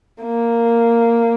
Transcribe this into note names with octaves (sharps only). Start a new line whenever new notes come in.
A#3